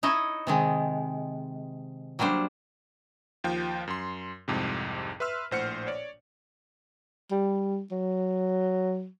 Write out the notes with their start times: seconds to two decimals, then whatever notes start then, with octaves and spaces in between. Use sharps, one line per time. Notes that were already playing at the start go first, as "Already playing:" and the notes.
0.03 D#4 E4 C#5 D#5
0.47 C3 D#3 G#3
2.19 F#3 G3 A#3 D4 C5
3.44 D#2 F3 F4 G5
3.87 F#2 C6
4.48 C2 F2 G#2 C3
5.20 B4 E5 C6 E6 F6
5.51 A#1 A2 C5 F#5 F6 C#7
5.87 C#5 D5
7.31 G3
7.91 F#3